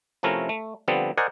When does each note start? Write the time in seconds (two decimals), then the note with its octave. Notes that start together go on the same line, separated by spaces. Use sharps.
0.23 C3 F3 A3 C#4 E4 A#4
0.49 A3
0.88 D3 F3 G3 B3 C4
1.18 A#4 C5 D5 D#5 F#5 G#5